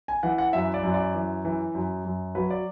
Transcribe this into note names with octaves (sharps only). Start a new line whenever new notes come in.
G#5
E3 F#5
F#5
F#2 E5
D5
F#2
D5
E3
E3
F#2
F#2
F#3 B4
D5